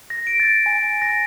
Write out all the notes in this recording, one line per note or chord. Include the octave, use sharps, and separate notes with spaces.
A#6
D7
A6
G#5
A#6